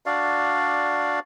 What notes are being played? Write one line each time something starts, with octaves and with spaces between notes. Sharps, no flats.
D4 F#4 D5 F5